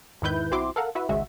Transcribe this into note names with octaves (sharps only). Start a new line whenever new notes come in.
E2 G#2 D#3 E4 B4 G6
B1 C4 E4 F#4 C6 D6
A4 A#4 F5 F#5
E4 F#4 B4 E5
G#1 C#2 G#3 F#4 E5